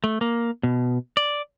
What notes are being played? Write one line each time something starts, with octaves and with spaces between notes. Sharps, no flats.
A3
A#3
B2
D5